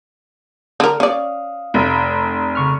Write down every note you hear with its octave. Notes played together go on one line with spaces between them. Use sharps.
D3 A#4
C#4 D5 F5 D#6
F1
C#3 C#6 F6